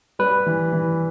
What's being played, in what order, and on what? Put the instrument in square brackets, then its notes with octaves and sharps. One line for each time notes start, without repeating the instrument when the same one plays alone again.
[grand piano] G3 [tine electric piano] B4
[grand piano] E3
E3